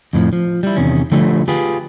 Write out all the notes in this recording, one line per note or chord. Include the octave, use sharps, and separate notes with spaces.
F2 A2 D#3 F3
F3
G3 E4
E2 C3 D#3 C#4
D3 F3 G3 A3
F4 G4 G#4 B4